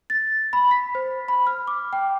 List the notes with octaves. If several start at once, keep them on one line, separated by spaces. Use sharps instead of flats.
A6
B5
B6
C5
B5
F6
D6
G5